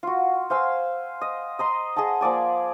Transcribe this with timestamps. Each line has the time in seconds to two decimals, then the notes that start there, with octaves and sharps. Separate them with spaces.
0.03 F4 F#4
0.50 C5 F5 G#5 E6
1.21 D#5
1.59 D#5 A#5 C6
1.96 G#4 D#5 F#5 A5
2.21 F3 A#3 D5 G#5